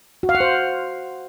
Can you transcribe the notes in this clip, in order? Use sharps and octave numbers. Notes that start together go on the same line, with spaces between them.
F#4
F5
F#5
C5